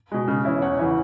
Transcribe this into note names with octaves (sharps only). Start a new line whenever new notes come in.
B2 G#3
C#3
E3 C#4 E4
E2 C#5 F#5
C#3 E3 C#4 E4